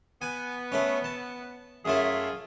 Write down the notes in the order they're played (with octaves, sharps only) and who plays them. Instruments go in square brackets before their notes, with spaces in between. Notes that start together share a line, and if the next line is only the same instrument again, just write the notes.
[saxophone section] B3 [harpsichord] G#5
[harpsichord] A3 C#4
A5
[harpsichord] F#2 A3 E4 [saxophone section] F4 G#4